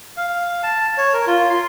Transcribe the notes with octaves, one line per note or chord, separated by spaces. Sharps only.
F5
A5
C#5
A#4
F4
C6